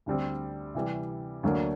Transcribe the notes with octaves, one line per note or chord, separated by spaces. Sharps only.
D2 D3 G3 C4
C3 E3 G3
D2 D3 F#3 A#3 D4